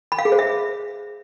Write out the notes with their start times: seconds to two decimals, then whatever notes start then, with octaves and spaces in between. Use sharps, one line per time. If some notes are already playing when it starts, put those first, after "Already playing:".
0.12 B5
0.19 F5
0.25 G#4
0.32 C5
0.39 E5